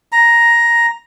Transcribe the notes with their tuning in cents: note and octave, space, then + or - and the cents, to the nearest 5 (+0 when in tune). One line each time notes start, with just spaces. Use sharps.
A#5 +5